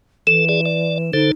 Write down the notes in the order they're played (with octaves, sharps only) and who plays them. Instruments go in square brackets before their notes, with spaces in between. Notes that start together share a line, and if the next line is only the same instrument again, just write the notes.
[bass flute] E3 [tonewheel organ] A4 [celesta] E7
[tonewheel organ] G#4 D5
D5
[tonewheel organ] D3 A4 C5 [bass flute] D#4